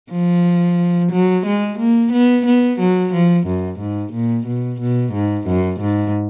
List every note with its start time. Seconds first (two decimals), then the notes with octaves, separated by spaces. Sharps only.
0.12 F3
1.11 F#3
1.46 G#3
1.79 A#3
2.12 B3
2.46 B3
2.79 F#3
3.13 F3
3.46 F#2
3.79 G#2
4.12 A#2
4.46 B2
4.80 B2
5.13 G#2
5.47 F#2
5.80 G#2